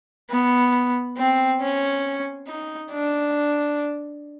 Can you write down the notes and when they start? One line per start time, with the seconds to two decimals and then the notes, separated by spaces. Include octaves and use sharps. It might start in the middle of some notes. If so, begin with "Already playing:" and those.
0.31 B3
1.18 C4
1.61 C#4
2.48 D#4
2.91 D4